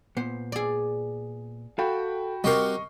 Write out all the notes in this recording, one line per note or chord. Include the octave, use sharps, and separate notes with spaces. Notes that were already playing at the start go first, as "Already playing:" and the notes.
A#2 B3 C5
G#4 D5
F#4 A4 F5 G5 B5
G3 C4 F#4 G4 A#4 D#5 C#6 C7